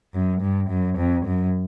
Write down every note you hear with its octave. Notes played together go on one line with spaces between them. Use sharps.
F#2
G2
F#2
F2
F#2